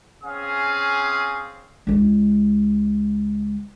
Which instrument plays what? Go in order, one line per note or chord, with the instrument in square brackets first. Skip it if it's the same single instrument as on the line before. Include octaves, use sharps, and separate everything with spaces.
[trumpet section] C4 C#4 G#4 F5 D#6
[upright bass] C#2 G#3